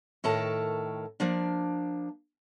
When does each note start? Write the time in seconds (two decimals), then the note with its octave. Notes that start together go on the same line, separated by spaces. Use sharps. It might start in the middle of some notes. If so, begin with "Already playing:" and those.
0.24 A2 D#3 A4 A#4 A5
1.20 F3 A#3 D4